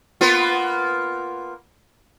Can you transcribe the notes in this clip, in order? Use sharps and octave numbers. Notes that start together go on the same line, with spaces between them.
A#3 B3 F4